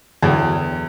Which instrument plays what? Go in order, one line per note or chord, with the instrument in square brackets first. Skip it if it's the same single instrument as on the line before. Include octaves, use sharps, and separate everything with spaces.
[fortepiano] E2 [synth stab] D3 F#3 G5